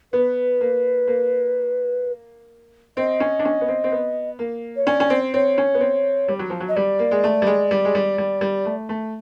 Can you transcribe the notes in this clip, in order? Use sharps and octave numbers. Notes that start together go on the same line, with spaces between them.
B3 B4
A#3
A#3
C4 D#5
C#4
D4
C#4
B3
C4
C4
B3
A#3
C#5
C#4 D5
C#4
C4
C4 C#5
C#4
B3
C4
G3
F#3
F3
F#3
D#5
G3 D5
A#3
G#3
A3
G3
G#3
G3
G#3
G3
G3
G3
A3
A3